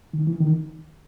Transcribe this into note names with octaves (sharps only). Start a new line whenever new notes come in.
D#3
E3
D#3